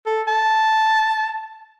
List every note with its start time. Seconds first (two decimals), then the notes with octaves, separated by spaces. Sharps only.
0.06 A4
0.27 A5